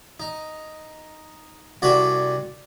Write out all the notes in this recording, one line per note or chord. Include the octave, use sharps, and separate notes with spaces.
D#4
C2 D4 F#4 D5 G#5 B5